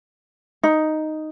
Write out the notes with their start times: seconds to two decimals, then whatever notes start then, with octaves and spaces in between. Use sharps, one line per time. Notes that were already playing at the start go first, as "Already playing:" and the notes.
0.63 D#4